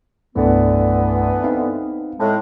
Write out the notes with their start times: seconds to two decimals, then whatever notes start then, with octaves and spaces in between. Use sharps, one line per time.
0.36 C2 G2 D3 E3 A3 B3
1.44 C4 D#4 F5
2.19 A2 G#3